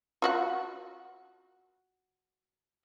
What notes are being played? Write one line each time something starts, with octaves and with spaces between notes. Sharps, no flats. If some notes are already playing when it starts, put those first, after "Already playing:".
F4 F#4 F#5